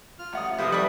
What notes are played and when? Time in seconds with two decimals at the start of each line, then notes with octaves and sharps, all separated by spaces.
0.19 F4 F6
0.33 A1 F#5 D#6
0.58 C3 F3 E4 A4 B4 C5 D#5 D#6
0.72 G3 B3 D#4 A4 B4 B5 C#6 D#6